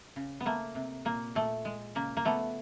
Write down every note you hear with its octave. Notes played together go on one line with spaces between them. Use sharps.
C#3
B3
A3 A#3
C3
A#2 A#3
A#2 A3
G#3
C#3 A#3
A#3
F3 A3 B3